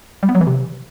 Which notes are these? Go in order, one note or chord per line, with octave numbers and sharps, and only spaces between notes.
G3
B3
F#3
E3
C3